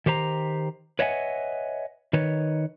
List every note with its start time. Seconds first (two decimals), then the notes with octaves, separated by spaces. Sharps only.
0.06 D#3 G4 C5 A#5
0.99 B4 C#5 D#5 E5 F#5 G#5
2.13 D#3 B4 C#5